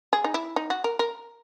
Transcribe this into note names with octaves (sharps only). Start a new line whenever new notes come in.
G#4
D#4
E4
D#4
F#4
A#4
A#4